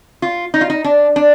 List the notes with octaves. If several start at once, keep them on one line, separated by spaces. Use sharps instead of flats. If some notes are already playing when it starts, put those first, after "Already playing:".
F4
D#4
F4
D#4
D4
D4